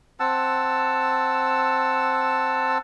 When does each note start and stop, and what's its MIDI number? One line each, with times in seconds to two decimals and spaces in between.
0.20 2.78 60
0.20 2.78 78
0.20 2.78 81
0.20 2.78 88